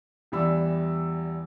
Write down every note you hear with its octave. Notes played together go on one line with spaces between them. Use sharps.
E2 E3 G3 B5 E6